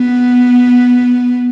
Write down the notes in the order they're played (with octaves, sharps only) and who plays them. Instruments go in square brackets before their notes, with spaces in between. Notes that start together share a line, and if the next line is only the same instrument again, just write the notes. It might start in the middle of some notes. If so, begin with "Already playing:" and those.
Already playing: [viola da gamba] B3